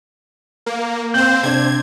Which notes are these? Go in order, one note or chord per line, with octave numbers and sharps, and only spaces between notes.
A#3
C4 C5 F5 G6 F#7
C3 D4 G#6